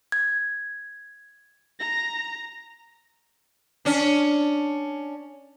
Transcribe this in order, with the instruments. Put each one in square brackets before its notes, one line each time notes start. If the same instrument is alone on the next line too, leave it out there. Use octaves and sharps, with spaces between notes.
[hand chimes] G#6
[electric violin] A#5 A#6
[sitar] C#4 D4